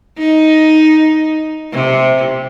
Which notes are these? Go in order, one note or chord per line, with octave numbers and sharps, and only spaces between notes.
D#4
C3